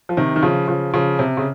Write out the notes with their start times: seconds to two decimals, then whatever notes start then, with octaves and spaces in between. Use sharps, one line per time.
0.09 F3
0.17 C3 D#3
0.36 D#3
0.42 C#3 F3
0.68 C#3 F3
0.94 C#3 F3
1.19 C3
1.37 C#3